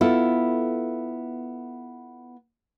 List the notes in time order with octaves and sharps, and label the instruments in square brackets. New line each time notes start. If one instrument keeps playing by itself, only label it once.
[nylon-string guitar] B3 E4 F4 A4